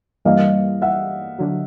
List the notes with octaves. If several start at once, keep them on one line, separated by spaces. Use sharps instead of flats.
G2 E3 G3 A#3 D#5 F5
E5 F#5
D3 F#3